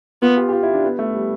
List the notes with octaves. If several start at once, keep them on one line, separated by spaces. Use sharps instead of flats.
B3 F4
G4
G4
F4
E4
D4
B3
A3
G3